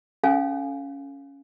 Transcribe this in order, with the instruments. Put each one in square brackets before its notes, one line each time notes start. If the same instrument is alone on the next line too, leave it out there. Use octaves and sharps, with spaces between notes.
[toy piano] C#4 A4 F5 G#5